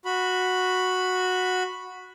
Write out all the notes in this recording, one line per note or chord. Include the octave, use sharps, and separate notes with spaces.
F#4 B5